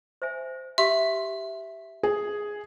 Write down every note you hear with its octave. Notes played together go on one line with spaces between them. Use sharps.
C5 E5 G#5
G4 E5 F5 C6
G#4